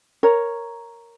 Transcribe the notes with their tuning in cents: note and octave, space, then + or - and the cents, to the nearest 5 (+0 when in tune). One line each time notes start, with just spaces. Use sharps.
A#4 +0 C#5 +0 A#5 +0